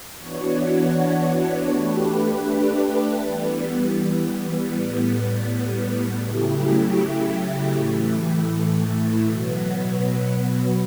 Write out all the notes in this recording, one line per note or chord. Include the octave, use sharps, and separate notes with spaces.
E3 B3 D4 F#4 C#5
A3 D4 G4 B4
E3 G3 B3
A2 G3 B3
C#3 F#3 A3 E4 G4
A2 E3 A3
B2 F#3 B3